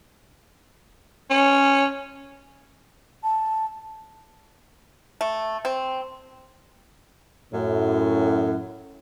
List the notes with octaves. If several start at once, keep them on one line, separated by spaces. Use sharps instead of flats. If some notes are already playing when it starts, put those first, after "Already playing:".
C#4
A5
A3
C4
F#2 A2